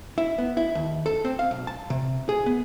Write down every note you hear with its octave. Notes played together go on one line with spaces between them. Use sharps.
E4
B3
E4
D#2
A4
C4
F5
B1
A5
C3
G#4
B3